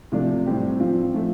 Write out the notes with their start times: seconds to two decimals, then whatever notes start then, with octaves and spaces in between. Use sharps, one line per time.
0.12 C3 F3 A3 D4
0.46 A2 G3 C4 G4
0.79 F3 C4 F4
1.14 F3 A3